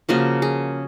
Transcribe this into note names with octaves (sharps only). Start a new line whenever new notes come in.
C#3 F3 A#3 F#4
G#4